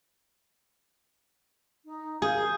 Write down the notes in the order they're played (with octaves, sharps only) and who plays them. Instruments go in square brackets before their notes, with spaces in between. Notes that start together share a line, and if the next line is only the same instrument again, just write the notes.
[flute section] D#4
[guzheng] G#4 [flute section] A#4 F5 G6